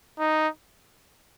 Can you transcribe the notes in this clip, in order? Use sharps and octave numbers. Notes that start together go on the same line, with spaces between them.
D#4